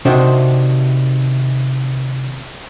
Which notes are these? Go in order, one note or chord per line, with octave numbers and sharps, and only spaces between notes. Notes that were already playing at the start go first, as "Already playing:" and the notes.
C3 D#3 D4 F#4 C5